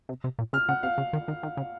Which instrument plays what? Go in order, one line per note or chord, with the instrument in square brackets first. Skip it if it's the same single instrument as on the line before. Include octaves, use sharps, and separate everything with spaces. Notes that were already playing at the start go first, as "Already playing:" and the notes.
[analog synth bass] C3
C3
A#2
[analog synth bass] C#3 [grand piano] F6
[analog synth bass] C#3 [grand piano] F#5
[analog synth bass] C3 [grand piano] F5
[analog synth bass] C#3
D#3
D#3
D#3
C#3